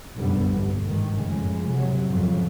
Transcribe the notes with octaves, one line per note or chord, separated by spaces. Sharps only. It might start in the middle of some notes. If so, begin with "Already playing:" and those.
F1 B1 F#2 D3 G3 B3
G1 D#2
G#2 D#3
F#1 F2 A2 C#3 G#3
C3 F#3
G#1 F2 C#3 F#3